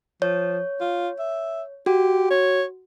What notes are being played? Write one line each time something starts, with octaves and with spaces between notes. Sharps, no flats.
F3 C#5
F4
E5
F#4 G4
C#5